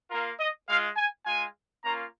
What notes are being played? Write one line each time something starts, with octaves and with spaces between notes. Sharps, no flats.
A#3 F4 A#4
D#5
G#3 F4 F5
G#5
G#3 F4 G#5
A#3 C#4 F4 A#5